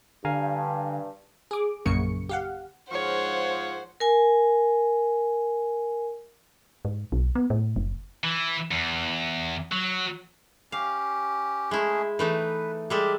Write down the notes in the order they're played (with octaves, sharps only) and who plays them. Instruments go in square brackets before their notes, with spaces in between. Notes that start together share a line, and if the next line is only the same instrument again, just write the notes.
[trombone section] G2 [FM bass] D3 [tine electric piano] F5 G#5 A#5
[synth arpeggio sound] G#4 D6
A#1 F#2 C#3 A#3 C#6 C#7
G4 F5 F#5
[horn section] G#2 F3 [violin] C5 F#5 [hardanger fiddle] C#5
[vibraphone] A#4 G#5
[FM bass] G#2
B1
B3
A2
F#1
[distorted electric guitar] E3
E2
F#3
[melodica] C#4 G4 [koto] F5
[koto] G#3 E4 [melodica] A3 C#4 G#4
[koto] E3 A3 D#4 [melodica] B4
[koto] G3 G#3 A4 [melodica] G4 E5